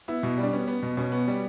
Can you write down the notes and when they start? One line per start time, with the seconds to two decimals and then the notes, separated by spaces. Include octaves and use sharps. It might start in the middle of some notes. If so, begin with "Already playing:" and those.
0.08 B3 E4
0.23 B2
0.38 G3
0.43 D4
0.53 B3 C#4
0.68 B3
0.83 B2
0.97 B2 C#4
1.12 B3
1.28 G3